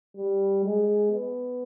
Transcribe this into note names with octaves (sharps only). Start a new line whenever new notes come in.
G3
G#3
B3